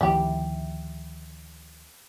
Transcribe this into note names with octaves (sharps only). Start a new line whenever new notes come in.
D2 D#3 F3 E4 G4